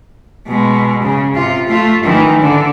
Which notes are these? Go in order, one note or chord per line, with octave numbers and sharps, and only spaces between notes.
B2 G#3
C#3
C3 F4
A3 F4
D#3 E3
D3